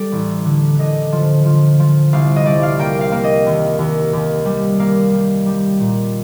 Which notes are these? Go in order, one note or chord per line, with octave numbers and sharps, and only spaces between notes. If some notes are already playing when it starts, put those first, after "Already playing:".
Already playing: G3 A4 D5
A1
D3
D3 D#5
F3
F3
F3
C2 F5
D#5
C2 D5
F5
A#3 G5
F5
A#3
D#5
D#2
D#2
D#2
G3
A#3 F5
G3
G3
A#2